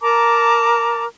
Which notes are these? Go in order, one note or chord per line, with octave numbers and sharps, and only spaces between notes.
A#4 A5 A#5 D6